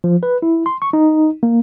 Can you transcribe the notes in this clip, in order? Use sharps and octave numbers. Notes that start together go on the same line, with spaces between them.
F3
B4
E4
C6
C#6
D#4
A#3